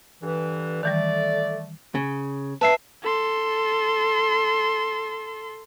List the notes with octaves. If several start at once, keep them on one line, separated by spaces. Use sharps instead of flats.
G2 D3 E3
D#3 E3 G3 A3 D5
C#3
B4 E5 A5 C7
A4 C6